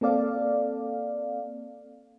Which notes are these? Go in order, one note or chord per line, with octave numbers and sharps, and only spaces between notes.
A#3 C4 A4 D5 F5